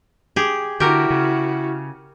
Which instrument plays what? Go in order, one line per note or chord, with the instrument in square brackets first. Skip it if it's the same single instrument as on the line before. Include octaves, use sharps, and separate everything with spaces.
[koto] G4 G#4
[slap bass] D3 [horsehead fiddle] E4 F#4 [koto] G4 A#4
[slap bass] C#3